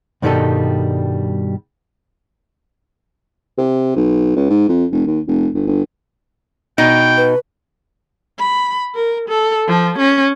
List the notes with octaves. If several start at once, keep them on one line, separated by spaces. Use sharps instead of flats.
G2 B2 D#3 G3 D#4 A4
C3
B1
C#2
G#2
F2
F1
D#2
F1
G1
G1
B2 D#4 G5
B4
B5
A#4
A4
F3
C#4